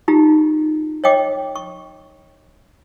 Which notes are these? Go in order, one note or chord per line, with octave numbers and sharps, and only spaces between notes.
D#4 F4 G4 A#5
C#5 D#5 G5 D6
C#6